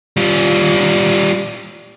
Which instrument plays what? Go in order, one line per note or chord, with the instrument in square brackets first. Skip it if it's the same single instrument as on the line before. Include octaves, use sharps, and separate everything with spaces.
[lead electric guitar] G3 F4